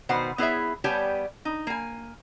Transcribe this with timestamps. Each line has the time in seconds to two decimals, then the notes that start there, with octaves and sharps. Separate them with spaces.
0.09 B2 D#3 C5 F#5
0.38 B3 E4 G#4 C5 C#5 E5
0.84 G3 B3 G4 C#5 G#5 A5
1.45 D#4
1.67 A#3 G#5